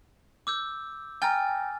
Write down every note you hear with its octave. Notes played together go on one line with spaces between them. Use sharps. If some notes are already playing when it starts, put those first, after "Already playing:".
D6 E6 G6
G5 G#5 A#5 F6 A6